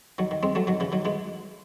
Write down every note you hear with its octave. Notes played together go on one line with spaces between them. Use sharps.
D#3 F#3
D#3
G#3 C4
F#3 A3
D#3 F#3
C#3 E3
D#3 F#3
E3 G#3